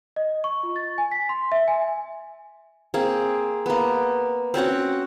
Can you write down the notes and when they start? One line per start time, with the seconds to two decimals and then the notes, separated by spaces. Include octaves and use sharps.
0.16 D#5
0.44 C#6
0.63 F4
0.76 A6
0.98 G#5
1.12 B6
1.29 C6
1.52 E5
1.68 G#5
2.94 A#3 C4 G#4
3.66 A#3 B3
4.54 C4 C#4 F#4 F#5